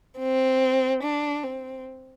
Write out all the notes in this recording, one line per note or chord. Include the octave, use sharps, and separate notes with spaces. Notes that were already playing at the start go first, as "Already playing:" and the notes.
C4
D4
C4